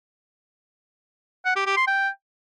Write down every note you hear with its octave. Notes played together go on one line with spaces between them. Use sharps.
F#5
G4
G4
C6
G5